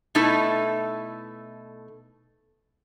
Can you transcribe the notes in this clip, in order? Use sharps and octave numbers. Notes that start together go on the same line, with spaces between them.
B2 A3 D#4 E4 A4